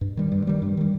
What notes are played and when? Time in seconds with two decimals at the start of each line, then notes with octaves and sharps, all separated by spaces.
0.01 G2
0.17 D#3 G3
0.32 G2
0.47 D#3 G3
0.62 G2
0.77 D#3 G3